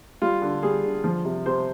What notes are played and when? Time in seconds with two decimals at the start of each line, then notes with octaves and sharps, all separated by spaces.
0.22 G3 F4
0.42 D3
0.63 G3 G#4
0.84 D3
1.04 F3
1.25 C3
1.46 C3 C5